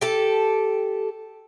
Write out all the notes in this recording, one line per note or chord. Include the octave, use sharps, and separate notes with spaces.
G4 A4